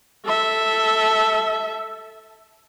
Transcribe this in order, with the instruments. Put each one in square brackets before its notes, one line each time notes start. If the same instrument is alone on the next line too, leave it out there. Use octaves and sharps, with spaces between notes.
[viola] A4 E5